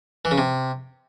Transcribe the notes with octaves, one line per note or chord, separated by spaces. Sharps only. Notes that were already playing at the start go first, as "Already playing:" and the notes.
E3
C#3
C3